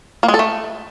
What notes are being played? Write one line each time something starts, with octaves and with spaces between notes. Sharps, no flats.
A#3
G#3
A4
A3